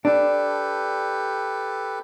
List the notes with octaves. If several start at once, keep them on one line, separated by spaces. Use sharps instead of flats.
D4 G4 A4 B4